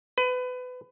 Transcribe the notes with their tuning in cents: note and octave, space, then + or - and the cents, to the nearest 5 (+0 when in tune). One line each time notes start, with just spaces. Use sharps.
B4 +25